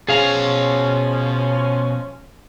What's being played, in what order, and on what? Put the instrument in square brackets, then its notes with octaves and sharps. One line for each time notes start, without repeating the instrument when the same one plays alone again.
[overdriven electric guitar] B2 A#5 [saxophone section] F3 C#4 [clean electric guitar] G#4 F5